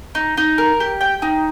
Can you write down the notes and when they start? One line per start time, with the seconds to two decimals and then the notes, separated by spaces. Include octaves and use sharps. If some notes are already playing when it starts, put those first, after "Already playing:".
0.15 D#4
0.37 D#4
0.58 A#4
0.80 G4
1.01 G5
1.22 D#4